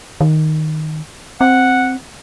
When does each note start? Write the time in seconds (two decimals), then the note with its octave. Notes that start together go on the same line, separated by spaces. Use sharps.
0.21 D#3
1.41 C4 F#5